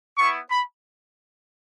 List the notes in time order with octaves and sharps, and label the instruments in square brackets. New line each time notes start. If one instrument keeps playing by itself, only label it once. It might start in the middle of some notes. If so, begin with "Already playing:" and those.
[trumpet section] B3 E4 C#6
B5